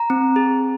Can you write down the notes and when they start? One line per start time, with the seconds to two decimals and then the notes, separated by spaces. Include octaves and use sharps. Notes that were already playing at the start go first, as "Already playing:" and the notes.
Already playing: A#5
0.10 C4
0.36 G#4